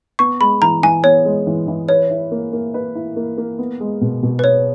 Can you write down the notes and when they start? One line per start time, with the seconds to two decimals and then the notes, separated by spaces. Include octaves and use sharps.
0.19 B3 C#6
0.41 G#3 B5
0.62 E3 A#5
0.83 E3 G#5
1.04 B3 C#5
1.25 G#3
1.47 E3
1.68 E3
1.89 B4 C#5
2.10 E4
2.31 A#3
2.53 A#3
2.74 B4
2.95 E4
3.16 A#3
3.38 A#3
3.59 B3
3.80 G#3
4.01 B2
4.22 B2
4.39 B4
4.44 B3 C#5